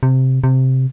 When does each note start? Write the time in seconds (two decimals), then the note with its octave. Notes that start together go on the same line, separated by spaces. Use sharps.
0.03 C3
0.44 C3